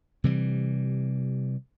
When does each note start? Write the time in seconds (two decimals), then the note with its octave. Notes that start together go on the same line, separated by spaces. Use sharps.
0.24 C3 E3 G3